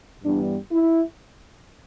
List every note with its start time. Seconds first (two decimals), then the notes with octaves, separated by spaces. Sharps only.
0.23 G2 E3 G3 B3 D4
0.72 E4